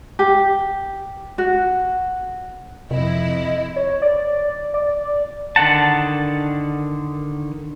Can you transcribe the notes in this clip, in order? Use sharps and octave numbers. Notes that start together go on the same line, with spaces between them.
G4
F#4
F2 C3 E4 D#5
C#5
D5
D5
D3 D#3 F#5 A5